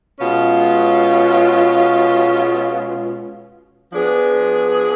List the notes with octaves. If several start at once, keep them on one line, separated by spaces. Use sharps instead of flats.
B2 G#3 C#4 F4
F3 B3 D4 G#4